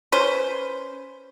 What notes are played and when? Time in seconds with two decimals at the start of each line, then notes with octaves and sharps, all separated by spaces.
0.12 C#4 B4 C5